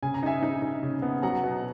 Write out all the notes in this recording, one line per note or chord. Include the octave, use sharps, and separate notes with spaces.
C#3 G#5
A#5
D#4 E5 G#5
D#4
D#4
C#3
B3
F#3 F#5 A#5
B2